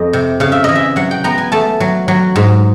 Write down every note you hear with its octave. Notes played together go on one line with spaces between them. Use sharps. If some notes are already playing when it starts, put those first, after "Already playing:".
Already playing: F2 D#5
C3
C#3 F5
E5
E3 D#5
E5
F#3 F#5
G5
B3 A#5
G#5
A3 A5
F#3
F#3
G#2